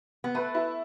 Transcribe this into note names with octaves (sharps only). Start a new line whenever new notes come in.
B3
A3 B4
E4